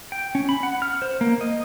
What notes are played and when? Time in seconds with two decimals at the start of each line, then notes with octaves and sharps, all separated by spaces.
0.12 G5
0.35 C#4
0.49 B5
0.63 F#5
0.82 F6
1.02 C5
1.21 A#3
1.41 D#5